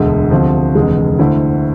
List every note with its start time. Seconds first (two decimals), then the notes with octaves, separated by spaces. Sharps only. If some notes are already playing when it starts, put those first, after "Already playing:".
Already playing: E1 D2 D3 G#3
0.31 D2 C3 F3
0.75 F1 E2 D3 G#3
1.19 D2 D3 A3 C4 E4